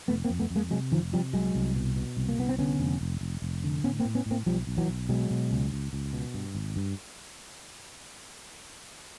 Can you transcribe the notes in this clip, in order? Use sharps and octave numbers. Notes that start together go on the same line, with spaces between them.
F1 A3 B3
A#3 C4
F2
A3 B3
F2
G#3 A#3
C3 F#3 G#3
F1 D#3 F3
C3 F3 G3
C2 F#3 G#3
C2
B2
B2
C2
A#3
C2 B3
C4
D3 B3 C#4
F1
F1
F1
F1
D3
A2 B3 C#4
A#3 C4
A2
B3 C#4
A2
A#3 C4
B1 F3 G3
B1
E3 F#3
B1
B2 F#3 G#3
B2
C#2
C#2
C#2
B2
G2
G#1
G2